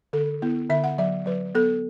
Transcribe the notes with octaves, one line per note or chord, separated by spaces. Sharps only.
D3 A4
B3 E4
D3 E5
F#5
F#3 E5
F#3 B4
B3 A4